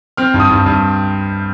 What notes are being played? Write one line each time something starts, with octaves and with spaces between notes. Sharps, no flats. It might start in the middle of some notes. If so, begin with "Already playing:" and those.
C4 F6
G2
D#6
G2
G2